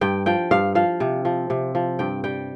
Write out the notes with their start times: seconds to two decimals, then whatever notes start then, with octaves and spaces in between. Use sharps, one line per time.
0.01 G2 G5
0.26 F3 G5
0.51 G2 F5
0.75 F3 F5
1.00 C3
1.25 F3
1.50 C3
1.75 F3
1.99 G2 G5
2.24 G3 G5